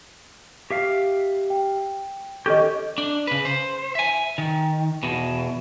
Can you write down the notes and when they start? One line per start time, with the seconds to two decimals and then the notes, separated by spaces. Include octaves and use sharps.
0.70 G4 E5 F5
1.50 G5
2.46 D#3 C#4 G4 A4 D#5
2.98 D4
3.27 C#3 B4
3.45 C5
3.95 E5 G#5
4.38 D#3
5.03 E2 B2